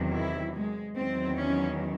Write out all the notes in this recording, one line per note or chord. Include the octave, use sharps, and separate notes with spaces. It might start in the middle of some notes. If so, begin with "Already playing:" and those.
Already playing: E2 C3 D#3 F#3
E4
G#3
E2 D#3 F#3 C4
C#4